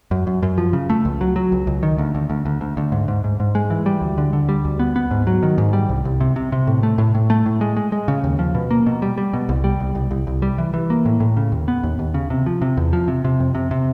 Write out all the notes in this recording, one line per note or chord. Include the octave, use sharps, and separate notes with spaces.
F#2
F#2
F#2
F3
C#3
A3
C#2
F#3
F#3
C#2
C#2
D#3
D2
D2
D2
D2
D2
D2
G#2
G#2
G#2
G#2
G#3
E3
G3
D2
D3
D3
G3
D2
B3
B3
G#2
F#3
D#3
G#2
G3
C2
C2
C3
C3
C3
A2
A3
A2
A2
A3
A2
G#3
G#3
G#3
C#3
D#2
F3
B2
A#3
B2
G3
G3
B2
C2
G3
C2
C2
C2
C2
G3
E3
E3
A#3
A2
A2
C#3
D#2
B3
D#2
D#2
C#3
C3
F3
C3
E2
F3
C3
C3
F2
C3
C3